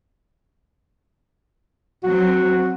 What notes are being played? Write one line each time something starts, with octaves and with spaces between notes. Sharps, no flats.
F#3 C4 F#4